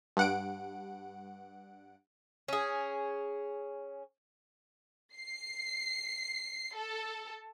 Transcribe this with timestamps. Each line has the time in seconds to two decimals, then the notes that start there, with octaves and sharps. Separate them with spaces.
0.17 G2 F#5 D7
2.48 C#4 G#4
5.16 C7
6.75 A4